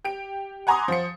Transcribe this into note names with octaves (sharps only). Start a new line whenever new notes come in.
G4 D7
F#5 G#5 A#5 C6 D6 D#6
F3 C5 C#7